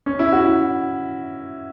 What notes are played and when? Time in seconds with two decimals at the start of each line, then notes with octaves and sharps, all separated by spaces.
0.06 C#4
0.19 E4
0.32 F#4
0.46 E4